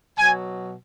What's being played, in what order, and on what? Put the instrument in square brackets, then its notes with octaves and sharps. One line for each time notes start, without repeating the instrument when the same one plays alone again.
[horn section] B2 F#3 G#5